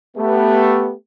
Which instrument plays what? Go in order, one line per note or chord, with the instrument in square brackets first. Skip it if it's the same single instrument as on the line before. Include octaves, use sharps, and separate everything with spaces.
[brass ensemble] A3 B3 G4